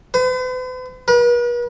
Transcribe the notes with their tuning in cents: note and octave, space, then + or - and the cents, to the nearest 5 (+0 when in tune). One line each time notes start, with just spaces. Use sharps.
B4 +45
B4 -45